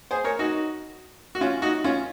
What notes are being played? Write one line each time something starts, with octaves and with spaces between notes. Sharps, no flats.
G#4 C5
A#4 C#5
D#4 F#4
F#4
C#4 F4
D#4 F#4
C#4 F4